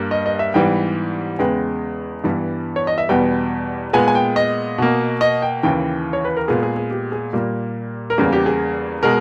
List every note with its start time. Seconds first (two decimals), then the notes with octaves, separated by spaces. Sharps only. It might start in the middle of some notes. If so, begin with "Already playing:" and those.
Already playing: G2 G3 A#3
0.11 D#5
0.26 D#5
0.39 E5
0.54 G#2 E3 G3 B3 G5
1.39 E2 C#3 G#3 B3 G5
2.24 G2 E3 G3 B3
2.76 C#5
2.87 D#5
2.98 E5
3.09 E2 B2 G3 B3 G5
3.93 A#2 G#3 B3 G#5
4.08 G#5
4.15 G5
4.36 D#5
4.78 B2 A#3
5.21 D#5
5.42 G5
5.63 D#2 C#3 E3 G5
6.13 C#5
6.25 B4
6.36 A#4
6.48 A#2 G#3 B3 G#4
6.63 G#4
6.77 G#4
6.90 G4
7.12 G#4
7.33 A#2 G3 A#3
8.10 A#4
8.18 E2 C#3 G3 A#3 G#4
8.33 G4
8.46 G#4
9.03 B2 G#3 A#4